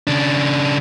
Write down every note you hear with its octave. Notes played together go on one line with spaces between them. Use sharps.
C#3 D4